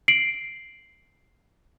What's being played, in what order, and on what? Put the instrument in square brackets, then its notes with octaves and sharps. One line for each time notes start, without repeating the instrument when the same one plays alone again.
[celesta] C7 D7 F#7